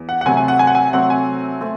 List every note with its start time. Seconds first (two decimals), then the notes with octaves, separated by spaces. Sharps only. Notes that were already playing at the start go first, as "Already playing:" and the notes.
Already playing: E2
0.09 F#5
0.21 F#5
0.25 C3 F#3 A3 C4 G#5
0.37 G#5
0.48 F#5
0.59 G#5
0.67 F#5
0.75 G#5
0.93 C3 F#3 A3 C4 F#5
1.10 G#5
1.61 A3 C4